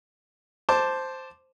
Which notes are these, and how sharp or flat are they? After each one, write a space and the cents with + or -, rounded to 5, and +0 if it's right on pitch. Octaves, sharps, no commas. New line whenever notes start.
C5 +0 A5 +0 D6 +0